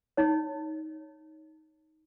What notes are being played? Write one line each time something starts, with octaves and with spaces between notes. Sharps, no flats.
D#4 C#5